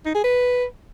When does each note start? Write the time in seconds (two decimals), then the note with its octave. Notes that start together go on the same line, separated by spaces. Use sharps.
0.06 D#4
0.15 G#4
0.24 B4